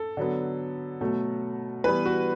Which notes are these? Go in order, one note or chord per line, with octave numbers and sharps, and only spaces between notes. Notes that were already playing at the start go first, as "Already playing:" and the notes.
Already playing: A4
D3 F#3 B3
B2 F#3 A3
E3 G3 B3 B4
F#4